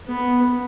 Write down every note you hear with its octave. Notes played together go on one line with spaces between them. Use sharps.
B3